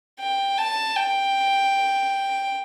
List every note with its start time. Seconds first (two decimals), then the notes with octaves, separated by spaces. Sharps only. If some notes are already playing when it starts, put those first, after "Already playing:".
0.20 G5
0.58 A5
0.96 G5